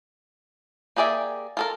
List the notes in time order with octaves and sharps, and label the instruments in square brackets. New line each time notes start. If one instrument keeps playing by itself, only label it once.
[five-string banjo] A#3 G4 G#4 D5 E5
F4 A4 A#4